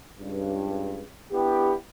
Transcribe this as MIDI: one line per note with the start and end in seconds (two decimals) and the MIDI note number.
0.19 1.03 37
0.19 1.03 43
1.32 1.72 59
1.32 1.72 62
1.32 1.72 64
1.32 1.72 67